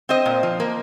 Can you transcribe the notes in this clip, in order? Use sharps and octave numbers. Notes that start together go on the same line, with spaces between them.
C4 C5 D#5
A#2
F3
A#3